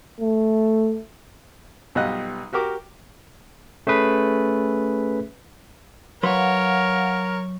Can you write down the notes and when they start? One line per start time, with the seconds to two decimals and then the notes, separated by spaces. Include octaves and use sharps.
0.21 A3
1.95 B1 B2 G3 F4 D#5 F#6
2.53 F#4 G4 A#4 D6
3.87 A3 C#4 G#4 B4
6.23 F#3 A#4 B4 C#5 F5 F#5 C6